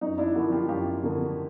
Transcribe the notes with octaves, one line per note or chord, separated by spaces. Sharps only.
F#2 D#4
D4 E4
D3 F3 A#3 E4 F#4
F4 G4
F#2 F4 G4
D3 F3 A#3